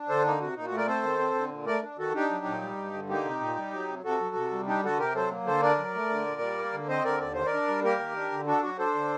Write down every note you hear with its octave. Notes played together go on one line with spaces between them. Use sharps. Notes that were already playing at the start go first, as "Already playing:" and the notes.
Already playing: D4
D3 A4 C5
A#3 D#4
C3 F#4
A#2 D#4
F#4
A3
A#4 D5
C4 A4 C5
D#3
C4
D3
A#2
A3 A#4 D5
D4
D#3 F#4 A4
D4 D#4 G4
F#3
A#2
G3
G2
D3
A#3 D#4 G4
C3
A#2
G3
F#3
C3
C3 F#4 A4
F#3
C3
G3
D4 D#4 G4
D3 F#4 A4
C3 G4 A#4
F#3 A4 C5
A#3
D3 A4 C5
D4 A#4 D5
F#3
A3
D3
A#2
G3
A#3
D3
C4 C5 D#5
D3 A#4 D5
D#2 D5
D#3 C5
A#4 D5
D4
G3
A#3 G4 A#4
D#3
D4
D3
D4 F#4 A4
F#3 F#4
D4 A4 C5
D3